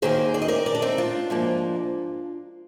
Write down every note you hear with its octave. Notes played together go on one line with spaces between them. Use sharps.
D#2 D#3 A#3 G#4 C5
D5
D#5
A#4 D5
A#4 D5
D4
C4 D#4
D4 F4
G#2 F3 A#3